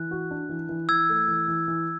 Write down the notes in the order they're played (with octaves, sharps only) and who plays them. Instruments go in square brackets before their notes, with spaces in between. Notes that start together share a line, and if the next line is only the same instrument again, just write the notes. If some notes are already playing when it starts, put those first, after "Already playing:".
Already playing: [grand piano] E3 [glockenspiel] F#6
[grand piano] F#4
D4
E3
E3
[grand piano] E3 [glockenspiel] E6 G#6
[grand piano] A3
E3
E3
E3